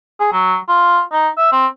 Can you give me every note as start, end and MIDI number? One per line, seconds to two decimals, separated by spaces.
0.20 0.30 68
0.32 0.56 54
0.68 1.01 65
1.12 1.28 63
1.37 1.52 76
1.52 1.66 60